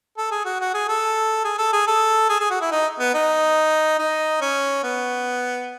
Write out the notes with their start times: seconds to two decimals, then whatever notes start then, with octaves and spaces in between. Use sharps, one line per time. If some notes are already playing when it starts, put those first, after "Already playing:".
0.18 A4
0.31 G#4
0.45 F#4
0.60 F#4
0.74 G#4
0.88 A4
1.44 G#4
1.58 A4
1.73 G#4
1.87 A4
2.29 G#4
2.40 G#4
2.50 F#4
2.61 E4
2.71 D#4
3.00 B3
3.14 D#4
3.99 D#4
4.41 C#4
4.84 B3